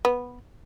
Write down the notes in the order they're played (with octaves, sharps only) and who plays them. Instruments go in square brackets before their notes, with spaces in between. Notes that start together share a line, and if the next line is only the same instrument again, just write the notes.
[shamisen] B3